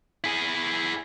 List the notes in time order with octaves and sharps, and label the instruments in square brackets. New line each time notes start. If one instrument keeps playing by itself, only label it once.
[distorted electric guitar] E4 G#4